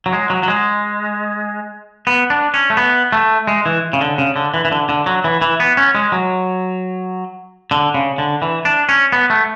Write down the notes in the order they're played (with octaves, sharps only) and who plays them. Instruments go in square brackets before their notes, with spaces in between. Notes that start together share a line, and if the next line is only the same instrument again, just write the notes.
[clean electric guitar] F#3
G#3
F#3
F#3
G#3
B3
D4
C#4
A3
B3
A3
G#3
E3
C#3
D3
C#3
D3
E3
E3
D3
D3
F#3
E3
E3
B3
C#4
G#3
F#3
D3
C#3
D3
E3
D4
C#4
B3
A3